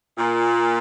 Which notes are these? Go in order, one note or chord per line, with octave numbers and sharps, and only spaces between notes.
A#2